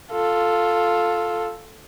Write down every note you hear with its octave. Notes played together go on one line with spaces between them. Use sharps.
F4 A4